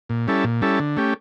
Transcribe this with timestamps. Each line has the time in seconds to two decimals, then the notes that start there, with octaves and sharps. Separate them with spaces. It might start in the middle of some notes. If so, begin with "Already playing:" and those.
0.10 A#2
0.28 G3 C#4 E4 A4
0.44 A#2
0.62 G3 C#4 E4 A4
0.80 D3
0.97 A3 C#4 G4